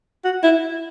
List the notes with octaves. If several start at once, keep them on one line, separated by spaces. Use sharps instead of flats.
F#4
E4